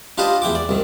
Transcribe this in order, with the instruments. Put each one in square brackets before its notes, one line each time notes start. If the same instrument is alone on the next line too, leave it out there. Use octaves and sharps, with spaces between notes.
[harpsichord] D4 F4 G4 B4 C5 D#5
E2 E4 G5 D6
D5
C2 D#3